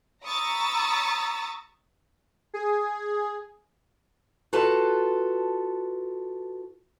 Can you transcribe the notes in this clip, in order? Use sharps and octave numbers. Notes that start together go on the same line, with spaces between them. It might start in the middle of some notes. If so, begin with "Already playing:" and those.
A#5 B5 C#6 D#6 E6 A6
G#4
F4 F#4 A4 B4 A5